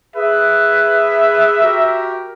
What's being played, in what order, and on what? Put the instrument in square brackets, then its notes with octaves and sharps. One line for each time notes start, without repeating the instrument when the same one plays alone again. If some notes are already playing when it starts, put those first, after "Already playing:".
[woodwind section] G#4 B4 [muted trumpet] E5
[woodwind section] F#4 G4 A#4